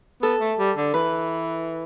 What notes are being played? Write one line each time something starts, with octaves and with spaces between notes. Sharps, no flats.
B3 A4
A3
G3
D3
E3 B4